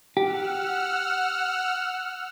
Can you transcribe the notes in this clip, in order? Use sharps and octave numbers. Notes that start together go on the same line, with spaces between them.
G4 F#5 E6 F6